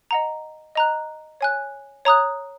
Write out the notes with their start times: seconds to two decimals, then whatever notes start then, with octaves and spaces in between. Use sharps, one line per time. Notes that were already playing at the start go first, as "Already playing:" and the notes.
0.11 D#5 F#5 A#5
0.75 D#5 A#5 F#6
1.41 C#5 G#5 F#6
2.05 C#5 A#5 D#6 F#6